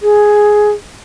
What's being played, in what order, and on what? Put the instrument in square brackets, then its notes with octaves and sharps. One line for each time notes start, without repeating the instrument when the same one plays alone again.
[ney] G#4